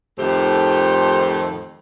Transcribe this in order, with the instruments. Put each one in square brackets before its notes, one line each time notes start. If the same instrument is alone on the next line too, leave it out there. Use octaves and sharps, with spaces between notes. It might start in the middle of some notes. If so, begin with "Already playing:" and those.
[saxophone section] F2 A2 D#3 A3 G4 C5